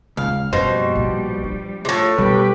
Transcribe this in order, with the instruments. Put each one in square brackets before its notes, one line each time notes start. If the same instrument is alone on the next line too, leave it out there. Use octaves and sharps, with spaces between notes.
[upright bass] D#1 [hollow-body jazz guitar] C#2 [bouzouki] F5
[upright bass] F#2 A#3 [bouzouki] B2 [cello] F3 G3 [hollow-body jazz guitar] C5
[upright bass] A#1
D4
[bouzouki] A2 C3 [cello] F4
[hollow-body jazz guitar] B2 G3 [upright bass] B3 [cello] G4 B4